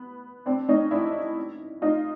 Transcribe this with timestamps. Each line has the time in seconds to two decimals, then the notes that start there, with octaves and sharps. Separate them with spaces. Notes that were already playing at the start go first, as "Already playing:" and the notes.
Already playing: B3
0.46 C4 D4
0.69 C#4 D#4
0.91 D4 E4
1.82 D#4 F4